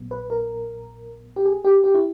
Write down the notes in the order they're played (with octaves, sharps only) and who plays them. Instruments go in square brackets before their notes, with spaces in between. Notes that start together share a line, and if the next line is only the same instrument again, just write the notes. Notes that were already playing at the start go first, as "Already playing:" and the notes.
Already playing: [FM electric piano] A#1 A#2 F#3 B3
B4
A#4
G4
G#4
G4
G4
E4